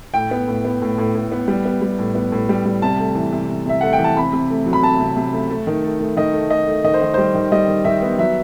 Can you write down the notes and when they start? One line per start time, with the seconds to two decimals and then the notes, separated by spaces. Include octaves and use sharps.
0.14 A2 G5
0.31 B3
0.48 A2
0.65 B3
0.82 A2
0.98 A2
1.15 A2
1.32 B3
1.48 G3
1.65 B3
1.82 G3
1.99 A2
2.15 B3
2.32 A2
2.49 G3
2.65 G3
2.82 C3 A5
3.00 A3
3.15 E3
3.32 C3
3.49 C3
3.66 C3 E5
3.81 A3 F#5
3.93 G5
3.99 E3
4.04 A5
4.17 C3 B5
4.33 C3
4.50 A3
4.66 F#3
4.73 B5
4.83 C3 A5
5.00 C3
5.17 C3
5.33 A3
5.50 A3
5.67 D#3
5.84 A3
6.00 A3
6.17 D#3 D#5
6.34 A3
6.50 A3 D#5
6.67 A3
6.84 D#3 D#5
6.94 C5
7.02 D#3
7.14 G3 C5
7.35 D#3
7.52 G3 D#5
7.68 D#3
7.84 D#3 E5
8.02 B3
8.19 F#3 E5